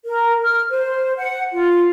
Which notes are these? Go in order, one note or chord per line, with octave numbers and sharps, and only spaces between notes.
A#4
F6
C5
F#5
F4